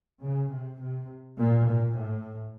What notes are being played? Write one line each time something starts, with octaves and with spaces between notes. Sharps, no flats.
C#3
C3
C3
A#2
A#2
A2